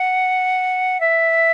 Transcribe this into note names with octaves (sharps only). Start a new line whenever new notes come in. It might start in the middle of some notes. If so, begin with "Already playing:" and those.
Already playing: F#5
E5